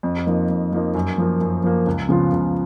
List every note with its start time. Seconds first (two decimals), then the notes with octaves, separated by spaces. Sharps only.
0.03 F2
0.27 F3 A#3 D#4
0.49 F2
0.72 F3 A#3 D#4
0.94 F#2
1.18 F3 A#3
1.41 F#2
1.64 F3 A#3
1.87 C#2
2.09 C#3 F3 B3 F4
2.32 C#2